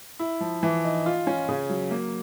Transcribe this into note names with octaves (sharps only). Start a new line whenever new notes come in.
E4
F3
E3
D#4
F4
C#4
C#3
F#3
A#3